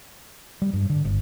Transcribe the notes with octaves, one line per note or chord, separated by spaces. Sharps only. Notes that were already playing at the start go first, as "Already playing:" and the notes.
G3
G2
D3
G1